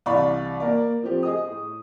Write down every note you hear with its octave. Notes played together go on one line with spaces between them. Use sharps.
C2 E3 D5 F5 B5 C#6
A#3 A#4 D5
F3 A3 C4 G4
G#4 D#5 D#6
A2